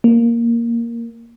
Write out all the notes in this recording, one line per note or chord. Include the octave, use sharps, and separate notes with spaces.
A#3